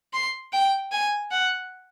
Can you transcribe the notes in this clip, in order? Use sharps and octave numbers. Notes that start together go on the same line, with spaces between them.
C6
G5
G#5
F#5